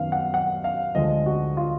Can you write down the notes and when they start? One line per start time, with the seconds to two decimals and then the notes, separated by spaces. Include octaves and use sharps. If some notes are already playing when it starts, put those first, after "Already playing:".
Already playing: F#2 D#3 F#3 B3 F5
0.12 F#5
0.34 F#5
0.64 F5
0.95 D2 D3 F3 G#3 D#5
1.26 F#4
1.57 F4